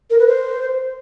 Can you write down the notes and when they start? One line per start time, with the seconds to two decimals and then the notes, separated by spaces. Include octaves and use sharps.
0.10 A#4
0.19 B4
0.27 C5